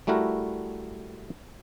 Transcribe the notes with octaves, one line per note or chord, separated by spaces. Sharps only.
G3 A3 E4 F#4 A#4